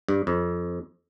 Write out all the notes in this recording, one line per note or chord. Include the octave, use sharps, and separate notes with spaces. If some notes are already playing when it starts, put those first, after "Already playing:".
G2
F2